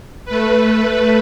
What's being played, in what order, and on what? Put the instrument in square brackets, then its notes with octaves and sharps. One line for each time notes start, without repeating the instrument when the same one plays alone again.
[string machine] A3 B4